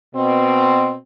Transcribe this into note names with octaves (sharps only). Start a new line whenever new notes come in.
B2 C4